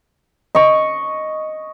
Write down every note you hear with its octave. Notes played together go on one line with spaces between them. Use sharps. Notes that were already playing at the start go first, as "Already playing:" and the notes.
D#5 C#6